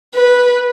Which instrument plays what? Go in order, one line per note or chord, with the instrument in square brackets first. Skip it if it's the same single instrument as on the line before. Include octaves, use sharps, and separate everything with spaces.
[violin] B4